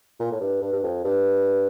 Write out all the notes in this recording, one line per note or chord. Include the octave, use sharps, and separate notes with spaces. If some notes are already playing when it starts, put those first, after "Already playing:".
A#2
A2
G2
G2
G2
F2
G2